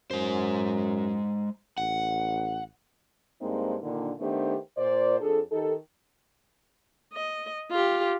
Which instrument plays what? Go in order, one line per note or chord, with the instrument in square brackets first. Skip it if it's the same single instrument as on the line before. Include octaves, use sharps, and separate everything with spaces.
[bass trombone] F#2 [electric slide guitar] G#3 C5
[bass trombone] A1 [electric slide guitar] F#5
[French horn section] G2 G#3 A#3 C4 D#4 C5
A#2 D3 D#3 A#3 D4
D#3 A3 B3 D4 G4 C5
A#2 C5 D5
F2 D4 G#4 A4
D#3 D#4 G4 A4
[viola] D#5
F4 G4